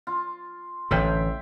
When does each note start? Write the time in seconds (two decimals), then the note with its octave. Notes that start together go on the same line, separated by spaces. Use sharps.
0.07 F4
0.91 A1 D3 E5 F5 G5